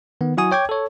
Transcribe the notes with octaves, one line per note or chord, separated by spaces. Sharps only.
D#3 B3
F#3 E4 F#4 G#5 D#6
C#5 G5 D6 G#6
A4 C#5